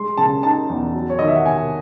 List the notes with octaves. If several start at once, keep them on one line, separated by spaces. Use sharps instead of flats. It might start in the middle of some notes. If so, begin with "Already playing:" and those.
Already playing: G#3 C6
C#3 A5
D#4 A5
E2
F#3
C#5
D#3 D#5
E5
F#5
C3 G#5